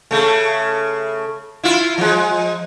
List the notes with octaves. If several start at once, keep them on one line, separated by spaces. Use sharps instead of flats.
C#3 A3
E4 F4
F3 G#3